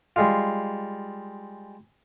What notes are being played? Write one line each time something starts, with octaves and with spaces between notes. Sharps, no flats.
G3 G#3 F4